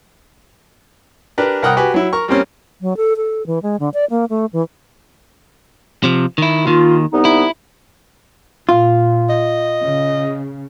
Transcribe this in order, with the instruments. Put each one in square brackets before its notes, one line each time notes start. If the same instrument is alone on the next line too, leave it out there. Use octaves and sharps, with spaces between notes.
[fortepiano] D4 G4 A#4 B4
C2 A#4 F#5 G5 D#6 F#6
F#4 G4 B4 G#5
F#3 E4
A#4 C#6
G3 A#3 C4 C#4
[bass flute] F#3
A4
A4
E3
G#3
D3
D5
A#3
A3
E3
[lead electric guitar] C3 F3
D#3 E4
[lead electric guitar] D#2 D#3 [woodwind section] F4
[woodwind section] C2 B3 D#4
[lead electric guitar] E4
[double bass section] A#2 [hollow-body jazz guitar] F4
[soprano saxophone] D#5
[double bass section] C#3